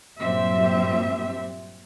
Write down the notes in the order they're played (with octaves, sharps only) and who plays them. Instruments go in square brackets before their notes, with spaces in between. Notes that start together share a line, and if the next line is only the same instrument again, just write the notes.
[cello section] G2 A#2 F#3 C4 G4 E5